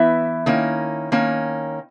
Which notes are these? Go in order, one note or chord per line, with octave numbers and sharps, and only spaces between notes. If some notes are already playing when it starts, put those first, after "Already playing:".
Already playing: E3 B3 E4 E5
D#3 A#3 C#4
D#3 A#3 C#4